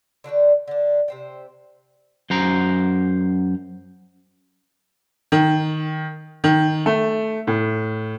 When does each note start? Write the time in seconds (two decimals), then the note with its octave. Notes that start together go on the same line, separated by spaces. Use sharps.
0.24 D3 D4 F#4 G5
0.68 D3 D4
1.08 C3 C5 G5
2.30 F#2 C5 A#5
5.32 D#3
6.44 D#3
6.86 A3
7.47 A2